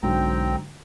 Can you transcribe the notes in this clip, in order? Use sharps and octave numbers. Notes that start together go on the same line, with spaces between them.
B1 G#2 D3 F#3 C4 G5 A#5